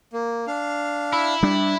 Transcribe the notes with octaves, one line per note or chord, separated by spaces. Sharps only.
A#3
D4 F5
E4 E5
G3 D4